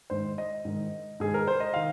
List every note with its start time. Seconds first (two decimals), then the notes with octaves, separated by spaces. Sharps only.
0.10 G#2 D#3 C5
0.38 D#5
0.65 G#2 D#3
1.20 G#2 D#3 G#4
1.34 A#4
1.48 C5
1.60 D#5
1.74 D#3 F5